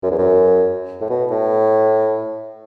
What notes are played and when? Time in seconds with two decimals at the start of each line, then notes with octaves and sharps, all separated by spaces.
0.03 F#2
0.11 E2
0.18 F#2
1.01 A2
1.10 B2
1.31 A2